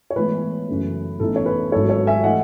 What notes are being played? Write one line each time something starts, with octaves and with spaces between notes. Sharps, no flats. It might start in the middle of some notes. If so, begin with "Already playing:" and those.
C#5
A2 E3 G#3 B3 B4
F#2 C#3 E3 A3
A1 A2 E3 B3 D#4 A4
C#5
B4
G#1 G#2 F#3 C#4 E4 A4 C#5
A4 C#5
E5 G#5
E3 A3 E4 D#5 F#5